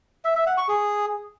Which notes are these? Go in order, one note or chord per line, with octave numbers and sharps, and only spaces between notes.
E5
E5
F#5
C#6
G#4